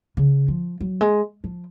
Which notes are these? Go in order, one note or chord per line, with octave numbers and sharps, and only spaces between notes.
C#3
F3
F#3
G#3
F3